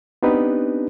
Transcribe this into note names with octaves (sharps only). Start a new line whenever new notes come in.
B3 C4 D4 D#4 G4 B4